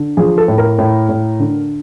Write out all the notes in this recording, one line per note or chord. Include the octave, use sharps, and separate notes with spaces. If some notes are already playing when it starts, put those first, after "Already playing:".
Already playing: D3
F3 G#4
A4
A2
A#4
A2
A2
D3